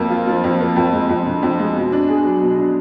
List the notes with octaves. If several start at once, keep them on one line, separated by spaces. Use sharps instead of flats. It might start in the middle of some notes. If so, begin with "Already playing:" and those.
Already playing: F2 A#3
F4
F3
F2
A#3
F2
G#3
F2
D3
F2
G#3
B2
D4
G#4
F#3
B2
D4